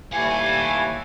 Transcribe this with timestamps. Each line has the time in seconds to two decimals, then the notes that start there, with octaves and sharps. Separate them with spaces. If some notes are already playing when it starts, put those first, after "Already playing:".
0.13 D#2 E3 G3 A3 F5 F#5 G#5